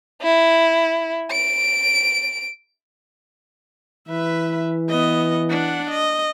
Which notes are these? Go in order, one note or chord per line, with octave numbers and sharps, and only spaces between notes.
E4
D7
E3 B4 E5
B3 D#5
D4 F#5
D#5